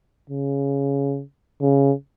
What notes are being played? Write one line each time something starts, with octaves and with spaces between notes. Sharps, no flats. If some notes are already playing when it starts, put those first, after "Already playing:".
C#3
C#3